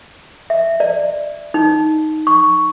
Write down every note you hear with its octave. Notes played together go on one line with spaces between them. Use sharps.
E5
D5
D#4
C#6